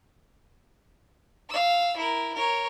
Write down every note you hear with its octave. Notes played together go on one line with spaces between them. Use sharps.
F5 E6
E4 A#4
A#4 C#5